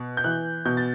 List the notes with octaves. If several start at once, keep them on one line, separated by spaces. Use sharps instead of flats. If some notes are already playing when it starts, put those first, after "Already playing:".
Already playing: B2
G6
E3 F#6
B2 G6
A6